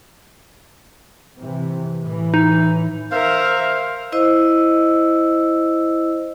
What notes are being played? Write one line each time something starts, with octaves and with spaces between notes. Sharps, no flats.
C3 E3
A2 E3
D#4
A#4 C5 E5 F5
E4 C5 D#5 E6